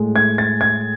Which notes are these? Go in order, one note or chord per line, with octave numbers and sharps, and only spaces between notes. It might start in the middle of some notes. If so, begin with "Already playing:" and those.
Already playing: A2 G#3
G#6
A6
G#6